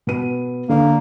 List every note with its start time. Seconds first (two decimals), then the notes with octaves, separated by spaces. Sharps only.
0.07 B2 B3 D#7
0.69 D3 A#3